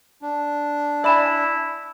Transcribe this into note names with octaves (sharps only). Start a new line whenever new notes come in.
D4
E4 D5 E5 G#5 B5 E7